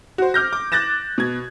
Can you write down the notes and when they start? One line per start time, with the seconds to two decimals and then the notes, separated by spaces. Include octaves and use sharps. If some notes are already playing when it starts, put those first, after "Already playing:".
0.18 F#4 C5
0.34 D6 F6 G6 A#6
0.53 D6
0.72 D6 F#6 G6 A6 A#6 E7
1.18 B2 G#6